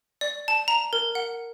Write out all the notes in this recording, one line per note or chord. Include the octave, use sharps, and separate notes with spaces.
D5
A5
A#5
A#4
F#5